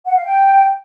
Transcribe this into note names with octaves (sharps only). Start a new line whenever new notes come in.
F#5
F5
G5